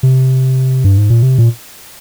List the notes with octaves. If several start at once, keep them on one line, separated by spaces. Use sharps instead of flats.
C3
G2
G#2
A#2
C3
A#2